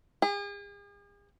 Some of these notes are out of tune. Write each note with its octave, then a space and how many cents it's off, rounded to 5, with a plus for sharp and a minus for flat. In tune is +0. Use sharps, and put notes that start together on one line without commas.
G#4 -45